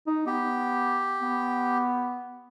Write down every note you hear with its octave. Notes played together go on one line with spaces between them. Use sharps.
D#4
B3 G4
B3